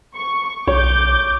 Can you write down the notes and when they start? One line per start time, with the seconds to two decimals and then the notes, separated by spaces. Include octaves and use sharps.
0.14 C#6
0.67 B1 C#5 D6 G6